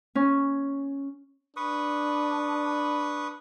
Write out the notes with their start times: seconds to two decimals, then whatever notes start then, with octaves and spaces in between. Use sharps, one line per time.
0.15 C#4
1.56 D4 B4 C#6 D#6